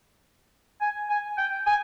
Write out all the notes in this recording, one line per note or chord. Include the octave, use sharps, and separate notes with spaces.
G#5
G#5
G5
G#5